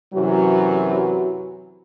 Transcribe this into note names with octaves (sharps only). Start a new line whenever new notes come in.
F#2 C3 E3 F#3 F#4